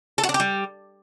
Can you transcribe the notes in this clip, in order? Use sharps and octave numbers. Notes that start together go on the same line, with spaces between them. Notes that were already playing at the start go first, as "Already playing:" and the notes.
A4
F#4
D4
G4
G3